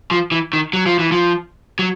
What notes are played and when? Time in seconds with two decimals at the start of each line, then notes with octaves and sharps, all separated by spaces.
0.11 F3
0.32 E3
0.53 D#3
0.73 F#3
0.86 F3
0.99 E3
1.12 F3
1.79 F#3